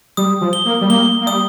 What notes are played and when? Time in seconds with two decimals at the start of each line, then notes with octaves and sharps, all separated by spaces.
0.17 G3 D#6
0.41 F3
0.53 G7
0.65 A#3
0.81 G3
0.90 A#3 G7
1.21 A#3
1.27 G3 D#6